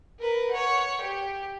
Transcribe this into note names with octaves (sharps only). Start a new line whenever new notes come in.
A#4 B4
C#5 F#5
G4